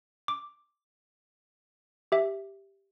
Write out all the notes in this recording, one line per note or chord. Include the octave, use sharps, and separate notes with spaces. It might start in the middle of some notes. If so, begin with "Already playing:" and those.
D6
G4 E5